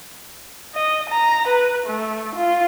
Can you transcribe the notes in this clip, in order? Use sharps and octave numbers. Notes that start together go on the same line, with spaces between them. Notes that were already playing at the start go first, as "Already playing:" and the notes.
D#5
A#5
B4
A3
F4